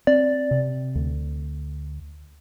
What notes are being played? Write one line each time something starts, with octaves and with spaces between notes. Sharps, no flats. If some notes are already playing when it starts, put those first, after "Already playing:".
C4 D5
C3
D2